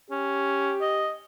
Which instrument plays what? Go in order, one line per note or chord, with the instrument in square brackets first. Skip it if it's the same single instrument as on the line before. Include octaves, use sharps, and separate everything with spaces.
[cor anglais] C#4 [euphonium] G4
[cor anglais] D#5